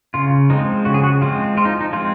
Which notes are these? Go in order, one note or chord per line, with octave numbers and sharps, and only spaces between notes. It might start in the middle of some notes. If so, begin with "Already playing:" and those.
C#3 F4
F3 G#3 C4 D#4
C#3 F#4
G#4
F#4
F3 G#3 C4 F4
F3 F4
D#4
D#4
G#3 C4 F4